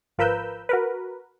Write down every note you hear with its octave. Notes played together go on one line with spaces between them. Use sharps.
G#1 F3 A#4 B4 E6 G6
F#4 A#4 B4